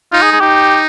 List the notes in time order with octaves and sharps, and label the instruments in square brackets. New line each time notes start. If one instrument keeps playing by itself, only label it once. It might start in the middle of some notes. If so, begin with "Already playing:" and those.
[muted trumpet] D#4 [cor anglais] F4
[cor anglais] G#4
G#4
[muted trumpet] D#4 [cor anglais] G4